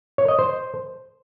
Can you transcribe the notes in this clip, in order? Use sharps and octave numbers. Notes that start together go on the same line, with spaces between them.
C#5
D#5
C5